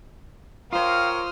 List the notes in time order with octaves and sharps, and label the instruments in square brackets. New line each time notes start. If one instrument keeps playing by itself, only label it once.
[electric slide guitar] F4 C5 [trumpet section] A#4 C#5 G5 [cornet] F5 [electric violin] D#6 F6